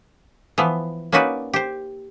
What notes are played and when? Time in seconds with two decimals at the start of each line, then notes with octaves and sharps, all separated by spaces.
0.58 E3 F3 B3
1.12 A#3 C#4 D#4 F#4 B4 D5
1.53 G4 C5